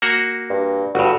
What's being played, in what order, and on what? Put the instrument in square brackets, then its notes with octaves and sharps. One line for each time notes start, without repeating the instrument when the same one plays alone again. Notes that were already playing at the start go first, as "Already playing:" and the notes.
[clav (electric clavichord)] A#3 F#4
[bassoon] G2
[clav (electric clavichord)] G1 G2 [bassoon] F#4